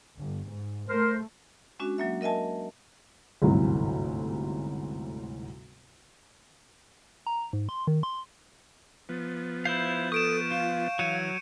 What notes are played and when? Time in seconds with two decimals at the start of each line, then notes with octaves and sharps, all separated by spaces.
0.18 G1
0.47 G#2
0.88 A3 A#4 C5
1.79 G#3 C#4 D4 F#4
1.98 F#3 A#3 E5
2.21 A#4 D#5 E5 G#5 A5
3.42 G1 D2 G#2 C3 E3 F#3
7.27 A#5
7.53 G#2
7.69 C6
7.87 D#3
8.03 C6
9.09 F3 B3
9.65 E4 C5 F5 G6
10.12 A4 C#6 D#6 D7 E7
10.51 F4 F5
10.99 E3 F#3 C#5 C#7 D#7